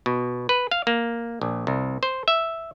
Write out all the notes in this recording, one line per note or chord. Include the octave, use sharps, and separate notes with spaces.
B2
B4
F5
A#3
A#1
C2
C5
E5